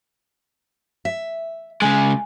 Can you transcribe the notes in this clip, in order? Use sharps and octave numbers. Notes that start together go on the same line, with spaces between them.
E5
C#3 G#3 G#5